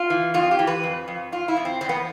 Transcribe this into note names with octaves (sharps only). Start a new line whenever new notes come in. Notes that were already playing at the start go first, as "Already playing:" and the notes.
Already playing: F4
E3
F2 F4
G4
E3
B4
F2
F2
F2 F4
E4
F2
C4
E2 C4
B3